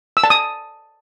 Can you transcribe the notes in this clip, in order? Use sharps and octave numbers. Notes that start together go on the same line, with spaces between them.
E6
A5
D#6